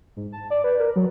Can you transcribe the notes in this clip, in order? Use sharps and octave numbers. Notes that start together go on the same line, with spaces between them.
G#2
A5
D5
B4
A#4
F#3